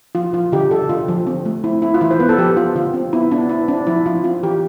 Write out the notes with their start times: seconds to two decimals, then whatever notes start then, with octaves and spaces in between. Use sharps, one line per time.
0.15 F3 F4
0.33 F3 F4
0.52 D3 G4
0.71 D3 A4
0.89 D3 F4
1.08 F3
1.27 C4
1.45 A3
1.64 C4 E4
1.82 C4 E4
1.94 F4
2.01 E3 E4
2.11 C5
2.19 B3 B4
2.29 A4
2.38 F3 G4
2.57 B3 F4
2.75 D3 F4
2.94 C4
3.13 B3 E4
3.31 B3 D4
3.49 C4 E4
3.68 C4 D4
3.87 F3 E4
4.06 F3 F4
4.24 C4 F4
4.43 E3 G4